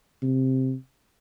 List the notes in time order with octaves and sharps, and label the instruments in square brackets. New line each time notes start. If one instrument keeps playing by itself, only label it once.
[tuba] C3